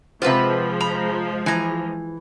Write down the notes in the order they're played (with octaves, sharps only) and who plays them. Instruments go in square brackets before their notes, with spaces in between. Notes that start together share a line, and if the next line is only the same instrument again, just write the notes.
[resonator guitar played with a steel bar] C3 C5 [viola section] F3 G#3 [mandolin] F4 F#4 B4
[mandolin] A#5 B5
[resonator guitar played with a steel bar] E3 [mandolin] G#5 A#5